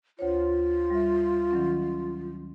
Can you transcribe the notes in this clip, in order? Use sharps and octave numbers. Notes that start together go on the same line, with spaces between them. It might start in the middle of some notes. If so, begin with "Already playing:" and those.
D2 F4 C5 C#5
G3 E5
D#3 F#3 C#4